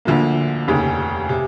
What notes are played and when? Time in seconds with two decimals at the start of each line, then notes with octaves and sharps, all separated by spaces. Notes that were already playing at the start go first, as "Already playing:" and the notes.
0.05 D2 D3 F3 A#3
0.68 F1 D#2 C#3
1.29 C3